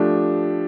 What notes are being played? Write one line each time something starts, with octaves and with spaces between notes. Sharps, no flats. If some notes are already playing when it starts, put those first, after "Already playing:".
Already playing: F3 A3 D4 G4